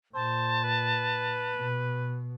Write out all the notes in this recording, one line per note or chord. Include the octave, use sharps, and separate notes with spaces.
A#2 C5 A5
B4
B2